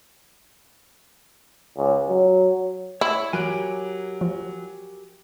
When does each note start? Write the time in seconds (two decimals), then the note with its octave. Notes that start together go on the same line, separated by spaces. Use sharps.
1.77 C#2
2.09 F#3
3.01 E4 C#5 C#6 E6
3.33 F#3 G4 A#4 G#5 F#6 D7
4.21 F3